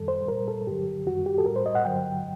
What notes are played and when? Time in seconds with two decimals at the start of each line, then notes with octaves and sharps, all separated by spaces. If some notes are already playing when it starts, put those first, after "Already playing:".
Already playing: F#2 D#3 G3 A4
0.08 C5
0.28 A#2 G3 A#4
0.48 A4
0.67 G2 D3 F#3 G4
1.07 F#2 D#3 G3 F#4
1.26 G4
1.38 A4
1.46 A2 G3 A#4
1.56 C5
1.66 D#5
1.75 F#5
1.85 G2 D3 F#3 G5